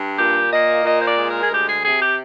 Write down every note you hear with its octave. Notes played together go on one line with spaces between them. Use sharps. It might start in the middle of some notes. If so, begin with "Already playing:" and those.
Already playing: G2
A#2 G4
A#3 D#5
A#2 D#5
C5
D5
G#3
A#4
G#4
D2 G4
G#4
C3 G#4
G4